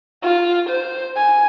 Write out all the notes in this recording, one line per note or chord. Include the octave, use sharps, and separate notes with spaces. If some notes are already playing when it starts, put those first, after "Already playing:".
F4
C5
G#5